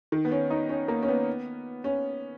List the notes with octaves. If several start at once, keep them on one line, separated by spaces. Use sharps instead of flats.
D#3
B3
C#4
D#4
C#4
A#3
C#4
B3
C#4